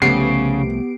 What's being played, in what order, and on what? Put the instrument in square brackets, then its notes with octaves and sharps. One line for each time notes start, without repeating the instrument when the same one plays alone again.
[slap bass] C2 F3 A3 [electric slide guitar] C#3 [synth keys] B3 G4 D7 [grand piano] C7